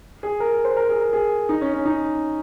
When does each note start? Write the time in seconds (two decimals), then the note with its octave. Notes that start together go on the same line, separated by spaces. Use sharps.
0.23 G#4
0.40 A#4
0.65 C5
0.77 A#4
0.89 G#4
1.01 A#4
1.13 G#4
1.49 D#4
1.61 C#4
1.74 C#4
1.85 D#4